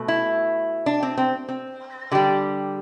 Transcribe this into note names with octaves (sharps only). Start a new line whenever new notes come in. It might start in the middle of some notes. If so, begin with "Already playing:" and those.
Already playing: B2 A3
E4
D4
C4
C4
C4
D3 G3 G4